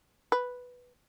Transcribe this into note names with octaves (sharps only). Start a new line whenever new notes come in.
B4